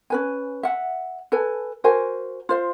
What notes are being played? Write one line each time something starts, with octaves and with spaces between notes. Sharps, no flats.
C#4 B4 G#5
E5 F#5
A4 B4 G#5
F#4 A#4 C5 G#5
F4 C5 F5